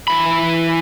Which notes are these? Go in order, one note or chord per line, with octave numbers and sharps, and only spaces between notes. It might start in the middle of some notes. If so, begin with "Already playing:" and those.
E3 B5